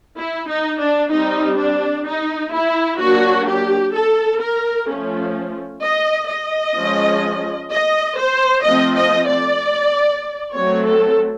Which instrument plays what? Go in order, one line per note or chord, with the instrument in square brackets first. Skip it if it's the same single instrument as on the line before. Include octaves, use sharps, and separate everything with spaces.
[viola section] E4
D#4
D4
G3 C4 D#4
D4
D#4
E4
F#3 A#3 D4 F#4
G4
A4
A#4
F3 A3 C#4
D#5
D#5
F3 G#3 C#4
D#5
C5
F3 A3 C4 D#5
D#5
D5
F#3 A3 C4 C#5
A4